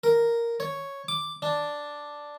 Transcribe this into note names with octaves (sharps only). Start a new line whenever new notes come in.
A#4
C#5
D6
D4